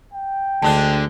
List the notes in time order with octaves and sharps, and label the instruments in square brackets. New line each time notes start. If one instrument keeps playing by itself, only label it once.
[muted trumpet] G5
[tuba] D2 [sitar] D3 G#3 D4 [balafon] A5